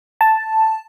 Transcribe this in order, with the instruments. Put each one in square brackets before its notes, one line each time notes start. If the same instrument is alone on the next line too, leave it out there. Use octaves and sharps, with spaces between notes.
[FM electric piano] A5